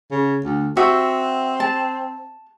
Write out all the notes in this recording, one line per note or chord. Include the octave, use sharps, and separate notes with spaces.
C#3
D2
C4 F#4 E5
A5